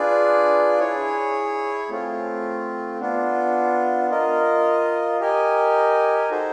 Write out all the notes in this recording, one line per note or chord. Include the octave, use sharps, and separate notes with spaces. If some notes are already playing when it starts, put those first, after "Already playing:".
Already playing: D4 F4 G#4 B4 D5
E4 G#4 C#5
A3 C4 F4
B3 D4 F4
F4 A#4 D#5
G4 A#4 D#5 G#5
D#4 F#4 A4 C5